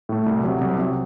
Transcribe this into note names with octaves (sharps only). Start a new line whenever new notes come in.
A2 A3
C2
C3 F#3
C2
C3 F#3